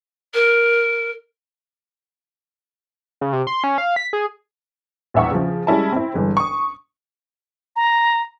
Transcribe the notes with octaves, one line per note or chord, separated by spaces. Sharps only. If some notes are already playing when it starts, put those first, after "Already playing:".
A#4
C#3
C3
C6
C#4
F5
B6
G#4
A#1 E2 E5 F#5 C#6
C#3 F3
G3 G#3 C#4 E4 A5
C4 E4
G1 E3 G#3
C#6 D#6
A#5